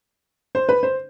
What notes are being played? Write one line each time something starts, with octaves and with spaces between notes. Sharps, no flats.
C5
B4
C5